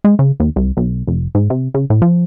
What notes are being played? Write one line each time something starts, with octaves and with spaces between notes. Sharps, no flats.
G#3
C#3
D#2
C2
B1
F1
G#2
C3
C#3
A2
F3